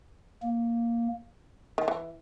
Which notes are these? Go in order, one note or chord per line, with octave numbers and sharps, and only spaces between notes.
A#3
D#3
E3